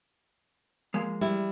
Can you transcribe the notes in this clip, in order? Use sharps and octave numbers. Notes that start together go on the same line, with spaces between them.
F3 G#3 A#3
G3 E4